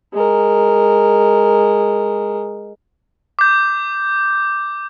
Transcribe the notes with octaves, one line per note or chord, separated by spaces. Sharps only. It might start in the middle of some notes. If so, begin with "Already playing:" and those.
G#3 A#4
D6 G6